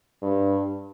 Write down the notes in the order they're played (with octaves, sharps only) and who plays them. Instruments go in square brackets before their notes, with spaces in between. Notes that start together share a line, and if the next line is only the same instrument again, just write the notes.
[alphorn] G2